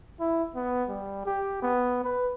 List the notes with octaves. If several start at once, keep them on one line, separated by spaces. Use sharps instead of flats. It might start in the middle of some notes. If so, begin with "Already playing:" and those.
E4
B3
G3
G4
B3
B4